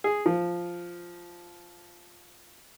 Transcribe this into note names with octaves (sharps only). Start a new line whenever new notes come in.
G#4
F3